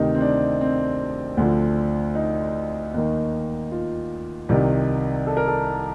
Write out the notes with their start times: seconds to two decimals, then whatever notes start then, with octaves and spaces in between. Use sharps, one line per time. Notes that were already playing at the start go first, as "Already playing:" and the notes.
Already playing: D2 C3 D#3 D#4
0.14 C4
0.21 D4
0.61 C4
1.37 D2 D3 F3
2.15 D#4
2.94 D#2 D#3
3.71 F4
4.49 C2 C3 D#3
5.27 A4
5.37 A#4
5.48 A4